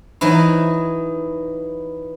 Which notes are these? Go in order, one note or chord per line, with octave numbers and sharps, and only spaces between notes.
E3 F#3 D#4 E4